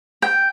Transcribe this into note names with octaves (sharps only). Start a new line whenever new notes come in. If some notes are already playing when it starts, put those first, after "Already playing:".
G5